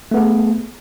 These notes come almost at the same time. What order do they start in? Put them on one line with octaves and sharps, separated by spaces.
A3 B3 G#4